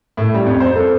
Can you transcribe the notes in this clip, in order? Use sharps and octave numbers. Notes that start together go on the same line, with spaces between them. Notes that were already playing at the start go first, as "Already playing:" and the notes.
A2
G3
F2
C5
A4